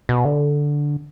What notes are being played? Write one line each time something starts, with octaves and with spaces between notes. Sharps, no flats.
B2
D3